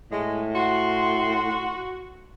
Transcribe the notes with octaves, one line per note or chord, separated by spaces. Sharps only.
A2 G#3
F#4 C6